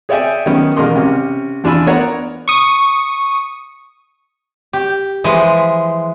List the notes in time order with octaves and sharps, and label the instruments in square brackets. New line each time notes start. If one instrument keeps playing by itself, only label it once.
[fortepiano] G#4 C#5 D5 E5 G5 G#5
D#3 F#3 B3 C#4
A1 B2 G#3 A#4 C6 D6
C3 C#4
E2 D4 F4 G#5 B5 E6
B3 A#4 C#5 D5 F#5 A#5
[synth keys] C#6 D#6
[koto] G4
E3 F3 G#3